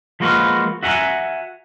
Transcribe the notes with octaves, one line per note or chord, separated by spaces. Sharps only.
F3 G#3 A#3 F#4 B4 F5
F#4 E5 F#5 G#5 A#5